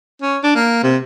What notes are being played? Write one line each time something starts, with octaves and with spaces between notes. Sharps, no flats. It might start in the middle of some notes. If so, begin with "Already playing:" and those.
C#4
D4
A#3
C3